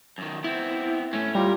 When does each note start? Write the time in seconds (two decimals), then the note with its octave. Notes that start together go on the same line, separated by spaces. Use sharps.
0.18 F#2 D#3
0.44 B3 C4 E4
1.13 A2 A3 C#4
1.35 G3 F4 A#4